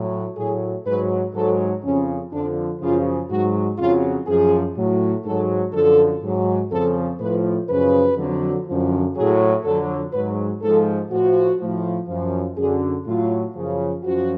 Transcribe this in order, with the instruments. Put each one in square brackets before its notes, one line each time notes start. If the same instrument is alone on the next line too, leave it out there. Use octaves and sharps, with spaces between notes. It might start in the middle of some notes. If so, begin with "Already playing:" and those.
Already playing: [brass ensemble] A2 F#3
A2 F#3 G#4
G#2 F#3 B4
G#2 F#3 A4
F2 C#3 F3 C#4
F2 D3 F3 D4
F#2 C#3 F3 F4
G#2 F#3 F#4
F2 C#3 F#3 F4
F#2 F3 G#4
A2 F#3
G#2 F#3 A4
F#2 D3 F3 A4
G#2 F#3
F2 C#3 F3 A4
A2 F3 B4
F#2 C#3 F3 B4
F2 D3 F#3
F#2 D3 F3
A2 F#3 G#4
F2 D3 F#3 A4
G#2 F#3 B4
G#2 F3 A4
A2 F3 F#4
A2 F3
F#2 F3
F#2 D3 F#3 G#4
A2 F#3 F4
F#2 C#3 F3
F#2 F3 F#4